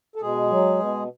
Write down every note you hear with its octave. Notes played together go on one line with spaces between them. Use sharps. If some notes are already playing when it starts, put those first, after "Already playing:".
A4
B2 G#3 G#4
F#3
B2